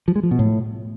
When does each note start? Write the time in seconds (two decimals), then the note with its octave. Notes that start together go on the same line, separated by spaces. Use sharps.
0.08 F3
0.16 G#3
0.23 F3
0.31 B2
0.39 A2